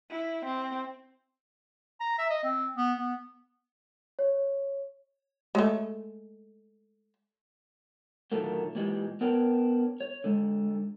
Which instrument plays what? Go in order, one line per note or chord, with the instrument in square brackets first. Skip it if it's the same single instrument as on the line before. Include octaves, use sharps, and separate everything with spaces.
[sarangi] E4
C4
[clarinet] A#5
E5
D#5
C4
B3
B3
[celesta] C#5
[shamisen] G#3 A3
[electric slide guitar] A#2 D3 D#3 F#3 A3 A#3
A#2 E3 G3 G#3
B3 D4 A#4 B4 C#5 G5
C#5
D3 G#3